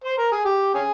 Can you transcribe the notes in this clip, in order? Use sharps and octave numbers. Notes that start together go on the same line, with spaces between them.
C5
A#4
G#4
G4
C#4 G#4